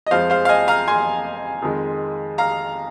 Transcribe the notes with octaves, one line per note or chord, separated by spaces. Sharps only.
D#5
F2 F3 G#3 C5 F5
C5 F5
F5
D#5 G#5
F5 A#5
G#5 C6
F2 D#3 G#3
F5 A#5